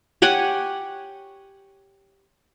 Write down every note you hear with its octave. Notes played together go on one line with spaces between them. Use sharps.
G4 C#5 F#5 G#5